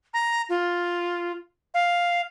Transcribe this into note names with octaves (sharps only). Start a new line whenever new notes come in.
A#5
F4
F5